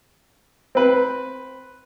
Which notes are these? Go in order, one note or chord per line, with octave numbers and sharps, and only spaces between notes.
C4 B4